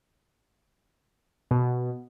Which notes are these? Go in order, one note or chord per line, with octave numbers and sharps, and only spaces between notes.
B2